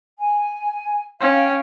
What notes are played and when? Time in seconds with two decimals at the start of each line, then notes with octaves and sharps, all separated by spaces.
0.19 G#5
1.20 C#4 F5 G5